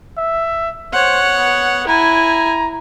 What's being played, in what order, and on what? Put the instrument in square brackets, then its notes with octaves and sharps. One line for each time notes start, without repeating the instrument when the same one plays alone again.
[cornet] E5
[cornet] C5 [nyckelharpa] C#5 F#5
[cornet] B3
[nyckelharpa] E4 G#5 [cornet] A#5